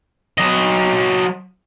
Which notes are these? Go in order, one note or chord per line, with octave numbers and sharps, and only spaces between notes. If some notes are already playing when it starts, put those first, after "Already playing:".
F#3 D#5